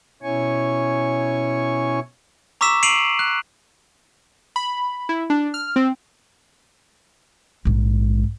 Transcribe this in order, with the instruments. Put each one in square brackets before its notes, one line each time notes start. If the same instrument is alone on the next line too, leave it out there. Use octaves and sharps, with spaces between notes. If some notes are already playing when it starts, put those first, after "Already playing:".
[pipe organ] B2 C#4 E4 C#5 G#5 C#6
[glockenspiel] A#5 C#6 D6 E6 B6 E7
C7 D7 D#7 F7 F#7
F#6
[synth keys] B5
E4
D4
F6
C4
[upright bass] A#1 G#2